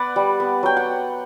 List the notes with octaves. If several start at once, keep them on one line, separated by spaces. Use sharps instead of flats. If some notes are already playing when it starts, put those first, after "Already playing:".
Already playing: B3 B4 D5 F#5
G3
B3
F#3 G5
F#5